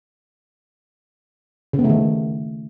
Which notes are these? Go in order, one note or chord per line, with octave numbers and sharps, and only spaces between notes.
C#3
B3
A3
D#3